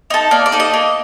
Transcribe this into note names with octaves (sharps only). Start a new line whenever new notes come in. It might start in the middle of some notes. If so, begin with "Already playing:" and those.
D#4 A4
A#3 D5
D5
D#4 A4
D#5
A#3